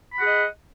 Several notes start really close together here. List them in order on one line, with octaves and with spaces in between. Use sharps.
B5 F#5 G#4 D#5